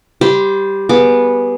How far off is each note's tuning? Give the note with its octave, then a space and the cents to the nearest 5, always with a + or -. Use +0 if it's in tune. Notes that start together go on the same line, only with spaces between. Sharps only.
G3 +0 C5 +0 C6 -30
B3 -10 G#4 +0 D6 -10